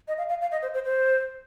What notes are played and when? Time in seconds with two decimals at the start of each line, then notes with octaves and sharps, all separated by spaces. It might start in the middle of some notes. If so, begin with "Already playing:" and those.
0.08 D#5
0.18 F5
0.29 F5
0.41 F5
0.52 D#5
0.62 C5
0.74 C5
0.85 C5